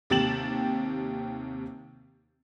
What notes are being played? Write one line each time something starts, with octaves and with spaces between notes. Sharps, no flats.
D#2 C3 G4 A6 E7 F#7